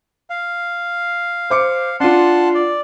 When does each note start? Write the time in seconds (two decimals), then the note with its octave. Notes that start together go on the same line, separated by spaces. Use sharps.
0.30 F5
1.50 C5 D6 C#7
2.00 D4 F4 F#5 A5 C6
2.55 D5